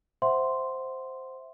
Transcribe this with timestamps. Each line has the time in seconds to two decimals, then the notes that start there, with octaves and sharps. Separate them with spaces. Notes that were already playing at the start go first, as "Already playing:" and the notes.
0.22 C5 E5 F#5 C6